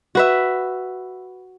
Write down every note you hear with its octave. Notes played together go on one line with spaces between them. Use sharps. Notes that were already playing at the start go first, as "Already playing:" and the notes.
F#4 B4 E5